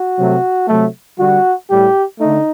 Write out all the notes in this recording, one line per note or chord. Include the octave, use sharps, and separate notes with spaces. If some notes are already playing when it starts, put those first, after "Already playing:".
Already playing: F#4
C3 F#3 A3
C3 F#3 A3
D3 G3 F#4
A2 G3 G4
D3 A3 D#4